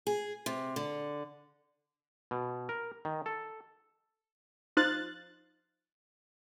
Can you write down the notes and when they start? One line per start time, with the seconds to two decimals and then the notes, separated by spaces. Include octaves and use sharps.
0.07 G#4
0.46 C3
0.76 D3
2.31 B2
2.69 A#4
3.05 D#3
3.26 A4
4.77 F3 D#4 C5 F5 F#6 A6